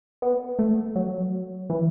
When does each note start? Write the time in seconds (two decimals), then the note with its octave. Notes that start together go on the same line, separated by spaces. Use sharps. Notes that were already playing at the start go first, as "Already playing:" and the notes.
0.22 B3
0.59 A3
0.96 F#3
1.70 E3